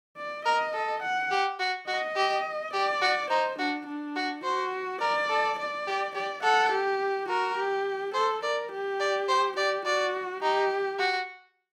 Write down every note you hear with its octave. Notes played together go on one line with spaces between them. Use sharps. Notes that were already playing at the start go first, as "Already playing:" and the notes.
D5
A#4 D#5
A4
F#5
G4
F#4
F#4 D#5
G4
G4 D5
F#4
D#4 C5
D4 F#4
D4
F#4
F#4 C5
A#4 D5
A4
D5
G4
G4 D5
A4 F#5
G4
F#4 A#4
G4
A4 C5
A#4 D5
G4
D5
C5
G4 D5
F#4 D5
D#4 G4
F#4